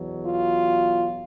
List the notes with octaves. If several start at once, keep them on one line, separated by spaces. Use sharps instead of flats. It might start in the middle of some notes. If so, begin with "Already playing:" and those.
Already playing: E2 B2 F#3
F4